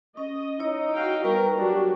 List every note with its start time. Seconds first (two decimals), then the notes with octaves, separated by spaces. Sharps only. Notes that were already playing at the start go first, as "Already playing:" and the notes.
0.17 C#4 D#5
0.60 D#4 E4 C#5
0.94 F#4 F5 G5
1.24 G3 B3 A#4 G5 C#6
1.58 F#3 D4 F#4 G4